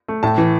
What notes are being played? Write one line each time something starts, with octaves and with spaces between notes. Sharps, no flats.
A3
A2 A5
E3